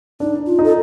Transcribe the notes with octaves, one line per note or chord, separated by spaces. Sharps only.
D4 D#4
F4
D#4
A4